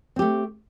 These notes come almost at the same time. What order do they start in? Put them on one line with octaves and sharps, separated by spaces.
C4 G4 A3